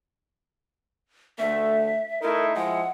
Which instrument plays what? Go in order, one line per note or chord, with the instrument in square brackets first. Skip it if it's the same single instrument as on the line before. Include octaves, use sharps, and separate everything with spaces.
[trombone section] D2 A3 [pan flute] E5
[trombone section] A3 D#4 E4 [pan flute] A#4
[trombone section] F3 G#3 E4 [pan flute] F#5